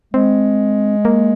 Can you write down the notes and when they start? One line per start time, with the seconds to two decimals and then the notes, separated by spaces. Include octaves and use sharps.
0.14 G#3 C4
1.05 A#3